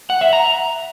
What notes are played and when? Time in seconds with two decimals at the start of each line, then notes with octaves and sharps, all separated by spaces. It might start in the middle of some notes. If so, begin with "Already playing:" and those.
0.10 F#5
0.21 E5
0.33 A#5